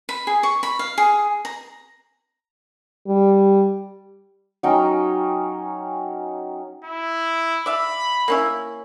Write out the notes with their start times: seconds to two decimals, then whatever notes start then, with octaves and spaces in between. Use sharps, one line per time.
0.09 B5
0.27 G#4
0.43 C#6
0.63 B5
0.79 F5
0.98 G#4
1.45 A#5
3.07 G3
4.63 F#3 C#4 D#4 G5
6.85 E4
7.66 D5 E5 F5 B5
8.28 A#3 C#4 E4